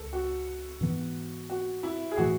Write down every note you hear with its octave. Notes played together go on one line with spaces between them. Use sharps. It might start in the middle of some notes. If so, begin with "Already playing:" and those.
Already playing: C#2 A4
F#4
G#2 E3 B3
F#4
E4
G#4
A2 E3 F#4